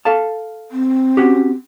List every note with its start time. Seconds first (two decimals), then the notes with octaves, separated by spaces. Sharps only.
0.05 A4 F5 A5
0.71 C4
1.17 C#4 F#4 G4